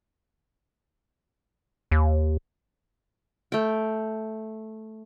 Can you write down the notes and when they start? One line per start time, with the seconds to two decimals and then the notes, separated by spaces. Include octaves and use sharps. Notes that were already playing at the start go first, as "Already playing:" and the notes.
1.91 D#2
3.52 A3 G5